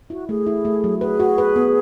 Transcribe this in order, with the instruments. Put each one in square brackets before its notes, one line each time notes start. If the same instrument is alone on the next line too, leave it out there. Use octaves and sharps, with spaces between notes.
[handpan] E4 [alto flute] F#4
[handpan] A3 [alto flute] G#4
[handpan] E4
A3
F#3
[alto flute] G#4 [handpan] B4
[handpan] F#4
B4
B3